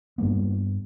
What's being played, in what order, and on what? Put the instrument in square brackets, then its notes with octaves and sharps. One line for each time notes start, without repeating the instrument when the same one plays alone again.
[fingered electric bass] G2 G3 A#3 B3